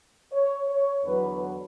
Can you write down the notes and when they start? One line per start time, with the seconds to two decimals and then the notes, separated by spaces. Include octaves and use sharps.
0.32 C#5
0.68 C#5
1.04 E2 D3 F#3 B4